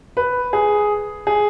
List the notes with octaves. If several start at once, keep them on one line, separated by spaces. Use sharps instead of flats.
B4
G#4
G#4